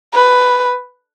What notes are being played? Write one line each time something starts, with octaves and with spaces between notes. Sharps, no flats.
B4